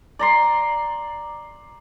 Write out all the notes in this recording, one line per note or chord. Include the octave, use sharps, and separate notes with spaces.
D5 A#5 C6